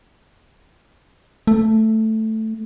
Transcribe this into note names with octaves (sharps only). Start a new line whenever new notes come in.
A3